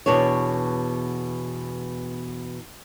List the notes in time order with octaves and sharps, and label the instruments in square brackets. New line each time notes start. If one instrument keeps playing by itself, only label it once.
[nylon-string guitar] E2 B2 B3 D4 C#5